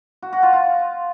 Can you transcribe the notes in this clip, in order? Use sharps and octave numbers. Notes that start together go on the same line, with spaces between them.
F#4
F#4
F4
F4